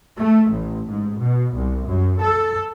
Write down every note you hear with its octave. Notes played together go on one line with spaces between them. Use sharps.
A3
A1
G#2
B2
C2
F#2
A4